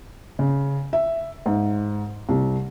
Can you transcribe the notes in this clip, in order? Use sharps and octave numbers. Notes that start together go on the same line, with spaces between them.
C#3
E5
G#2
C2